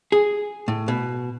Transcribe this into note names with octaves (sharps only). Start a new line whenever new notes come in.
G#4
A2
B2